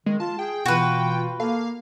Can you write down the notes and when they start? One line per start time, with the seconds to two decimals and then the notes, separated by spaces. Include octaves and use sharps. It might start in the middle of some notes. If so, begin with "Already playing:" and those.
0.06 D#3 G#3
0.20 F4 A5
0.39 G#4 G5
0.66 B2 E3 F4 F#4 B4
1.40 A#3 A4 F5